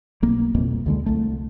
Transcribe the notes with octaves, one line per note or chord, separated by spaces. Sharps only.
B1 A#3
C2 F2 B2 A#3
D2 D3 G#3
C2 A3